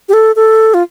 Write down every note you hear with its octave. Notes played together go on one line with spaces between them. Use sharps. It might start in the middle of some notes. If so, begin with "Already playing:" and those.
G4
A4
A4
F4